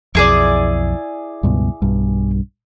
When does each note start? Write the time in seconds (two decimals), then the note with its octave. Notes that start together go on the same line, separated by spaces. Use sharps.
0.15 B1 F2 E4 G#4 D5
1.43 C#2 G2 B2
1.82 B1 G2